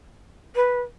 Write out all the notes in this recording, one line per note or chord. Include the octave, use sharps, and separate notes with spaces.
B4